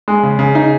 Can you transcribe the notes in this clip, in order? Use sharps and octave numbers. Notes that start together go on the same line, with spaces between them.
G#3
C#3
C#3
D#4